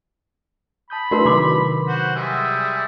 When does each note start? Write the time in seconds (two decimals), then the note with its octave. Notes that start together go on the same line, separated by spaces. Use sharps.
0.90 A5 B5 D#6 G6
1.11 A3 D4 E4 F#4 A#4 B4
1.25 C3 D#3 F#3 C6 D6
1.88 F#4 C5
2.16 G3 G#3 E5